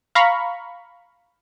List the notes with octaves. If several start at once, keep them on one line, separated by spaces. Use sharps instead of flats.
F5 A#5 B5 C#6